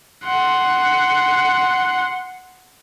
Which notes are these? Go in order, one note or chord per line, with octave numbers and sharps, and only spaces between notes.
F#5 C6